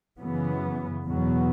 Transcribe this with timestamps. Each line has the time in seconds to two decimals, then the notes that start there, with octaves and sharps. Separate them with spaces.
0.19 F#2 C#3 E3 B3
1.05 E2 B2 F#3 B3